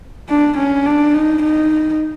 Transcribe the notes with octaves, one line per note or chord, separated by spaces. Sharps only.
D4
C#4
D4
D#4
D#4